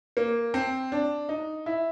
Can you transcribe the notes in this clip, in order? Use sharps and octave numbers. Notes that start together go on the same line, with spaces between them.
A#3
C4
D4
D#4
E4